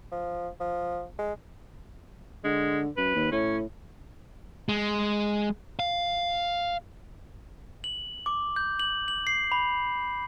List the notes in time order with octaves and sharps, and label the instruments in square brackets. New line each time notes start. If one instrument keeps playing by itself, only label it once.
[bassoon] F3
F3
G#3
[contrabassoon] D3 [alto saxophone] G#3
[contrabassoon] F#2 [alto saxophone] B4
[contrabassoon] D#2
[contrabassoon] A2 [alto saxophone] C#4
[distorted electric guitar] G#3
F5
[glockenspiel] F#7
D6
G6
F#7
F#7
C7
B5